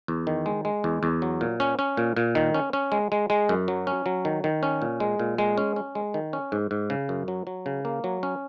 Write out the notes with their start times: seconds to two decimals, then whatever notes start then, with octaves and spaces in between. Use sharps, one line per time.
0.08 E2
0.27 D#3
0.46 G#3
0.65 G#3
0.84 E2
1.03 E2
1.22 F#3
1.41 A#2
1.60 C#4
1.79 C#4
1.97 A#2
2.16 A#2
2.35 D#3
2.54 C#4
2.73 C#4
2.92 G#3
3.12 G#3
3.30 G#3
3.49 F#2
3.68 F#3
3.87 C#4
4.06 F#3
4.25 D#3
4.44 D#3
4.63 C#4
4.82 A#2
5.00 G#3
5.19 A#2
5.38 G#3
5.58 C#4
5.76 C#4
5.95 G#3
6.14 D#3
6.33 C#4
6.52 G#2
6.71 G#2
6.90 C#3
7.09 F#2
7.28 F#3
7.47 F#3
7.66 C#3
7.85 A#3
8.04 F#3
8.23 C#4